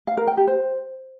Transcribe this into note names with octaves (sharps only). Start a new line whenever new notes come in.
F5
A#4
G5
G4
C5